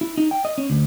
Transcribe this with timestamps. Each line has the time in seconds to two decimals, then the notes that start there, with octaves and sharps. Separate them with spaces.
0.01 E4
0.18 D#4
0.31 G5
0.45 D#5
0.58 C#4
0.70 D2